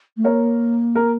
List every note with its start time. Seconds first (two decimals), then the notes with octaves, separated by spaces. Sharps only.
0.17 A3
0.24 A#3 A#4 C#5
0.95 A#4